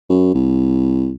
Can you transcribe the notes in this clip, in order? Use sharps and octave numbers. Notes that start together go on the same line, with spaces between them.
F#2
C2